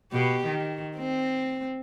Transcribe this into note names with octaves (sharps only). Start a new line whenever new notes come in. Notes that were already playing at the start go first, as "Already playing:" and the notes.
B2 G4
D#3
C4